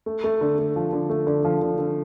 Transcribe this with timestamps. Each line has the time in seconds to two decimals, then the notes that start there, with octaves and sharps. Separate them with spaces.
0.06 A3
0.24 A3
0.41 D3
0.59 A3
0.76 F3
0.93 D3
1.10 A3
1.27 D3
1.45 F3
1.62 D3
1.79 D3